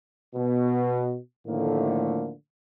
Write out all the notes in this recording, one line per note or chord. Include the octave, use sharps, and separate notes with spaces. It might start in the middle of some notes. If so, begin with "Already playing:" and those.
B2
A2 D3 D#3 F3 A3 A#3